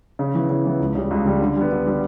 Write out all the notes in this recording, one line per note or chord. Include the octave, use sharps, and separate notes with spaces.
C#3
E3 B3
C#3
E3 B3
C#2
C#3 G3
C#2
C#3 G3
D3
G3 B3
D3
G3 B3